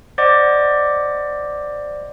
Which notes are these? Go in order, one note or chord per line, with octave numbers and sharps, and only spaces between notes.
C5 D5 D#5 F#5 D6